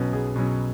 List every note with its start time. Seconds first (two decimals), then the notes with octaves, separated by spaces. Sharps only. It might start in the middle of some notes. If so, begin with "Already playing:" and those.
Already playing: B1 B2 F#3 C#4 B4
0.12 B1 G#4
0.36 B2 F#3 C#4